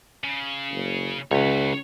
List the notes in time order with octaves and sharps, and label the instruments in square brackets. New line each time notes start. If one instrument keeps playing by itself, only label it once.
[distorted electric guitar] C#3
[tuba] F#1
[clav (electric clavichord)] C#2 [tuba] C#3 [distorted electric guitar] B4 C#5